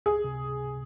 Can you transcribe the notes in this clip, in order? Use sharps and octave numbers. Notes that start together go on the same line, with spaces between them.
C#2 G#4
C3
C#2